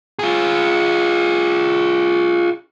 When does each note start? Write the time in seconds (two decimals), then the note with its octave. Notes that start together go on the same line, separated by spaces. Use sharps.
0.19 F4 G#4